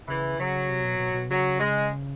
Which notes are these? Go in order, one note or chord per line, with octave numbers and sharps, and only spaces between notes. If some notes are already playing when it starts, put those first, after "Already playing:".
C#3 E3
C#3 F#3
C3
B2
B2
B2
C#3 F#3
G#3